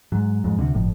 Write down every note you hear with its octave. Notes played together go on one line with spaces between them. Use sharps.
G#2 F#3
F2 G#2
D2 C3 F#4
G1 F2 A2